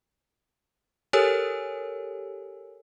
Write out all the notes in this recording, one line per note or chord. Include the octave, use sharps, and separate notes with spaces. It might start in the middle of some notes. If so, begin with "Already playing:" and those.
G4 A4 A#4 C#5 G#5 E6